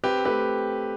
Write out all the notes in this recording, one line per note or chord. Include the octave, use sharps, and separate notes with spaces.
C4 G4 B4
A3 G4 B4